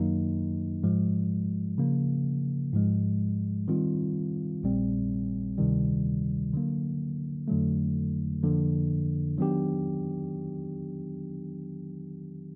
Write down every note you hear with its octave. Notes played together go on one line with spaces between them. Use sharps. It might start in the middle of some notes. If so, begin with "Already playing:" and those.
Already playing: F#2 D#3 F#3 A#3 D#4
G#2 F3 G#3
C#3 F3 A#3
G#2 F3 G#3
D#3 G3 C4 F4
A#1 A#2 G3 C4
D2 C3 D#3 G3
D3 F#3 A#3
F2 D3 F#3 A3
F2 D3 F3 A#3
D#3 F#3 B3 D4 G4